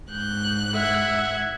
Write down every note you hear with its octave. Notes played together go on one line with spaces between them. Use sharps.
G#2 F#6 G6
E5 F#5 G#6